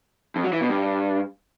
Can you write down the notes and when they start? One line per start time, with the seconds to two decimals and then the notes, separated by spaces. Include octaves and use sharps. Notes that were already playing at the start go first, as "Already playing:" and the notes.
0.36 F2
0.44 F#3
0.53 E3
0.61 B2
0.69 G2